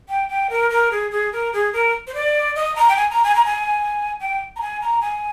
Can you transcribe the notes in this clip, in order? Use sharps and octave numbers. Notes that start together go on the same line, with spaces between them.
G5
G5
A#4
A#4
G#4
G#4
A#4
G#4
A#4
C5
D5
D#5
A#5
G5
G#5
A#5
G#5
A#5
G#5
G5
A#5
G#5
A#5
G#5